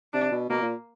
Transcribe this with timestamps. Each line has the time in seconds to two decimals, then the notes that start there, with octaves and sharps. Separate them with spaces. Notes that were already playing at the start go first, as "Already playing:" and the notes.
0.13 C3 D4
0.32 B2
0.50 B2 A#3
0.62 A#2